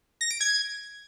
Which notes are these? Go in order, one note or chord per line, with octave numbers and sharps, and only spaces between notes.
A#6
D7
G#6